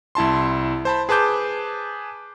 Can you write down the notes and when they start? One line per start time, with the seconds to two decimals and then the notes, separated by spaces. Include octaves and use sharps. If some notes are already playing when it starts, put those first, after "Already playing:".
0.15 C2 E4 A5 C6
0.85 C5 A5 B5
1.09 G#4 B4 A5 D6 G6